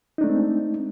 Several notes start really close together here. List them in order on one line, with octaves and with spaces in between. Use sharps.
D#4 D4 A3 G#3 C4